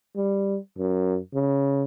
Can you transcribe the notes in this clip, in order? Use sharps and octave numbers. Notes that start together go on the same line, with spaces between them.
G3
F#2
C#3